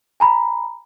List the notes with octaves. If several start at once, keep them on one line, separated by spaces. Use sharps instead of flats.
G#5 A#5 B5